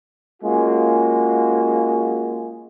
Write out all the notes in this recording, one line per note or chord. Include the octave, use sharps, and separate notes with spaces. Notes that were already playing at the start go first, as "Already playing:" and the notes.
G#3 A#3 C#4 F4 F#4 G#4